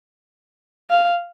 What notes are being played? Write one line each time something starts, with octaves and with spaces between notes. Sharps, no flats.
F5